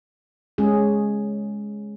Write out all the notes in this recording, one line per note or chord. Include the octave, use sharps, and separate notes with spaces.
G#3 C#4 G#4